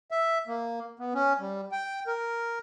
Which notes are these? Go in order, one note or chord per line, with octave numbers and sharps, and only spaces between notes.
E5
A#3
B3
C#4
G3
G5
A#4